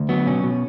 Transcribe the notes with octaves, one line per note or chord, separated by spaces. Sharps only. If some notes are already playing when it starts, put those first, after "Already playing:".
Already playing: D2
F#3 B3
B2 C#4
B2